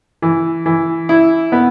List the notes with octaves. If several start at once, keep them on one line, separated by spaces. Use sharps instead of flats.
E3
E3
E4
B3